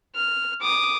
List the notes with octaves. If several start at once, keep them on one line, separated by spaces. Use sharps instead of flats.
F6
D6 D#6